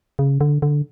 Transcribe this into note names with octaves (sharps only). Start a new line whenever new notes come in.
C#3
D3
D3